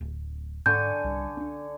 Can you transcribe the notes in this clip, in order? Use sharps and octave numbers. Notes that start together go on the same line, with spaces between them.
D1
G#2 D3 G#5 C#6 G6
C2 G3
C#4 D4